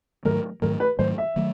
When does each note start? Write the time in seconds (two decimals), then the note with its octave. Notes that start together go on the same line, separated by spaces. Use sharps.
0.25 G#2 D#3 F#3 A3 A#4
0.62 G#2 D#3 F#3 A3 A#4
0.80 B4
0.99 G#2 D#3 F#3 A3 C5
1.18 E5
1.36 D#3 F#3 A3